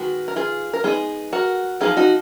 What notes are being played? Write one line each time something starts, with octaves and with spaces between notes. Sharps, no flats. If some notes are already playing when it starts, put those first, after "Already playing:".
Already playing: D#3 G#3 B3 F#4
A#4
F4 G#4
A#4
G#3 B3 D#4 F4 G#4
F#4 A#4
F3 B3 D#4 F4 G#4
D#4 F#4